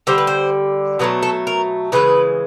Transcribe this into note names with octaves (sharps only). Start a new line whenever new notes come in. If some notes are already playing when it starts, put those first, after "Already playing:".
D3 G3 C5
B4
C5
B2 F#3 A3 B4
A4
A#4
C#3 E3 G#3 B4